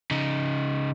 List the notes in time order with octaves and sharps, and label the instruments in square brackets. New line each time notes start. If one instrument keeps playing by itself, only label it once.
[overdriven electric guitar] C#3 D#4